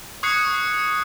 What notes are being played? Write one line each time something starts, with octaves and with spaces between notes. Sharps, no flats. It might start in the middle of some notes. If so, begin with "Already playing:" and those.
C#6 D#6 F#6 G#6 C7 C#7